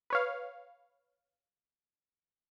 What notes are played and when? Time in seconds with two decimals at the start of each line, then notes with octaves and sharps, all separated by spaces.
0.10 B4 C#5 F5